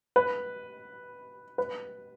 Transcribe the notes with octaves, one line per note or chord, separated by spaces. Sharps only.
B4
B4